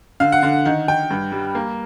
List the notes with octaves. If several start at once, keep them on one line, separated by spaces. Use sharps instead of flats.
D3 F5
F#5
D3 F5
D#3 F#5
D#3 G5
G2
G3
A#3